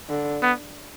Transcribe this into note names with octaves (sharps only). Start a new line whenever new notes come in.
D3
B3